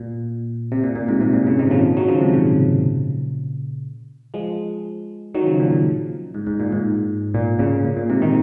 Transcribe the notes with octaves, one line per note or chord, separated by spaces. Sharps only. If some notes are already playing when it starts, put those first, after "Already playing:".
Already playing: A#2
C3
A#2
A#2
G#2 C3
G#2 C3
A#2
A#2 C#3
C3 D#3
C#3 F3
D#3 F#3
C#3 F3
G#2 C3
A#2 C#3
F3 G#3
D#3 F#3
C#3 F3
A#2 C#3
A#2
G#2
G#2
A#2
G#2
A#2
A#2 C#3
A#2
A#2
G#2 C3
C3 D#3